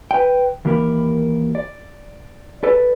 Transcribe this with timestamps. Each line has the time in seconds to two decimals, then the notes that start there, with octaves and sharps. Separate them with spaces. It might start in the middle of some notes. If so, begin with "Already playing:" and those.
0.11 B4 G5
0.65 D#2 E3 A#3 G4 A#4 B5
1.55 D5
2.63 A4 B4 D5